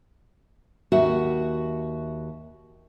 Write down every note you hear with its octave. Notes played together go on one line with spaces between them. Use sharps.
D#2 F#4 E5